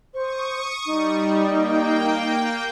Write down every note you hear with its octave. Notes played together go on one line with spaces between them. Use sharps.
C5 C#6 D#6
G3 D#4
A#3 G5